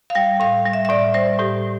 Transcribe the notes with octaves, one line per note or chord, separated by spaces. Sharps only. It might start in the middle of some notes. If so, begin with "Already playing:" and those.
F5
G3 G5
A2 F5
G3
E5
E5
A2 D5
G3 C5
A2 G4